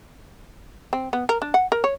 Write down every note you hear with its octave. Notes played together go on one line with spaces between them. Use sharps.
C4
B3
A#4
D4
F#5
A#4
C#5